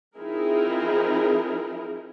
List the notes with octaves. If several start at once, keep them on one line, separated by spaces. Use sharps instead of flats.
F3 C4 D#4 E4 G#4 A#4